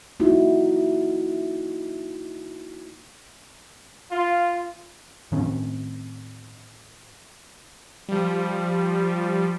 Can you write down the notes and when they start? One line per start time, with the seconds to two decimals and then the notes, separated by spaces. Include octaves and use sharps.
0.20 A#3 D#4 E4 F#4
4.12 F4
5.32 A2 D#3 C4 C#4
8.09 F3 G3